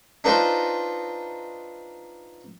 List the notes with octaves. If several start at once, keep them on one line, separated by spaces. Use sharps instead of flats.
D4 D#4 F4 B4 C5